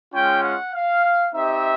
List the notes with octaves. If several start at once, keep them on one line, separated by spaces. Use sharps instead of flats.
G#3 C#4 F4 G5
F#5
F5
C4 D#4 G4 E5